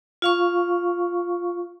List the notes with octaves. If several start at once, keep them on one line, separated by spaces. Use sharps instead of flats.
F4 F5 C#6